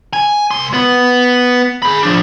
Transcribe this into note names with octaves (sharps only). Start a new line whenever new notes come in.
G#5
C2 C6
B3
G#4 B5
F3 D4